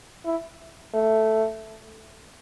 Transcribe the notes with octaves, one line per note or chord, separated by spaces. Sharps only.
E4
A3